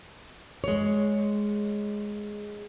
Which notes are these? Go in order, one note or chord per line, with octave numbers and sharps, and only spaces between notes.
G#3 C#5